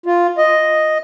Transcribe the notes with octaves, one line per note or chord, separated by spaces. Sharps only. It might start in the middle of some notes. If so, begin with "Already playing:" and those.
F4
D#5